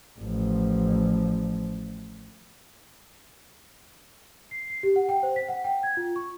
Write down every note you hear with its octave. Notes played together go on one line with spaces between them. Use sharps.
A1 F3
C7
C7
G4
F#5
G5
C5
B6
F#5
G5
G#6
F4
C#6